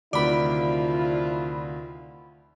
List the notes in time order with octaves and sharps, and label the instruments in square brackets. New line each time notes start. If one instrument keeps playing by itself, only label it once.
[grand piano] D2 C3 D#3 [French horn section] F3 E4 F4 [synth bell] D5 B5